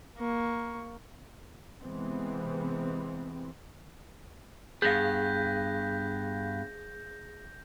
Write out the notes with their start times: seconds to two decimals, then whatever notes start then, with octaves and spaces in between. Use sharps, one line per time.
0.17 A#3 C#6
1.82 C3 E3 G#3 B3 C4
4.82 G2 B3 G#4 F5 G6 A#6